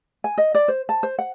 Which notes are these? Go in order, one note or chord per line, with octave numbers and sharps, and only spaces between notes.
G#5
D#5
D5
C5
A5
C5
F#5